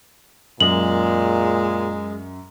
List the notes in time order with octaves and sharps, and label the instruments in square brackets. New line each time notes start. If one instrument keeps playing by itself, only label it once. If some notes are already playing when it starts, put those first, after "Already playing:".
[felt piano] F#2 [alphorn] A#2 [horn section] G#3 [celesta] F#7